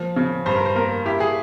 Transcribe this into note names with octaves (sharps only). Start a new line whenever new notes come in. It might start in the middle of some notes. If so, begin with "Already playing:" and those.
Already playing: F3 A#3
C#3
G2 C5
A#4
C5
A#3 A#4
E4 G4
G#4